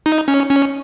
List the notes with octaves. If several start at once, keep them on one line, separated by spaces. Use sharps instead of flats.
D#4
C#4
C#4